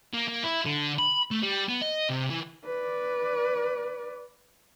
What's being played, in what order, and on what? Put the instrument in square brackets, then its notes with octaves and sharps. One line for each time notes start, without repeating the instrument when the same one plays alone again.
[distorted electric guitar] A#3
A#3
E4
D3
B5
A3
G3
B3
D#5
C3
E3
[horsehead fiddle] B4 D5